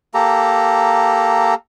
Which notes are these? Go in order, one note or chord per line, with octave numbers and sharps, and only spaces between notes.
A#3 G4 A4 A#5